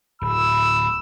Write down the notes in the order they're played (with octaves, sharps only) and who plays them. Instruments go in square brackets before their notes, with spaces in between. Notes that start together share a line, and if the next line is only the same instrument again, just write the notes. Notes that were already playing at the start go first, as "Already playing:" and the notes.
[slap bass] D1 [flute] B5 [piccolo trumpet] E6